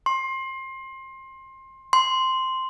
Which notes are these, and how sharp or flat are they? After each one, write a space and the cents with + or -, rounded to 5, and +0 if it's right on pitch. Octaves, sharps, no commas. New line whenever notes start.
C6 +25
C6 -5